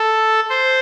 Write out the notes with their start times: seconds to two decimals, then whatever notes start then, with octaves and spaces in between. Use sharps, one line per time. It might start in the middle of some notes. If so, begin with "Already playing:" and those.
Already playing: A4
0.50 C5